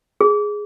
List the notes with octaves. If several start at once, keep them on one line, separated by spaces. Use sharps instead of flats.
G#4